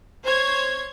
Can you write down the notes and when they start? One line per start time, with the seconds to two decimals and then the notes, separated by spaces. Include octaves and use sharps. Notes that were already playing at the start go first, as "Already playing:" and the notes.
0.25 C5 C#5 G#6